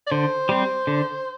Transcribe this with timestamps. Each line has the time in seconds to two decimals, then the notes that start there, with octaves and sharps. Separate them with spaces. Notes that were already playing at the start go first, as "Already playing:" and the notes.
0.07 D5
0.11 D3 C5
0.49 G3 C4
0.87 D3